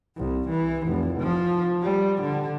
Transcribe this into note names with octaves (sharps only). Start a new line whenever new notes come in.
C2
E3
F1
F3
G3
D3